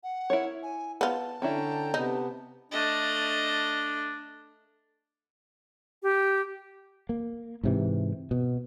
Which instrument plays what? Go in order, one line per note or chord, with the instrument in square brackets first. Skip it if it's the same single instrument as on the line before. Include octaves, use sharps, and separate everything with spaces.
[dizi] F#5
[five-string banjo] E4 A#4 C#5
[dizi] G#5
[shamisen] B3 F4 [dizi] A5
[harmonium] D3 G5 A#5 [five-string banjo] C#4 D4 E4
[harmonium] C3 B3 [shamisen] D#4
[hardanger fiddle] A3 D#5 [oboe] D4
[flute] G4
[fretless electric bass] A#3
G#2 C3 E3
B2